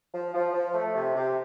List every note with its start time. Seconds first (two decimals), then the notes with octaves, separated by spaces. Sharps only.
0.14 F3
0.34 F3
0.53 F3
0.74 A3
0.94 C3
1.15 C3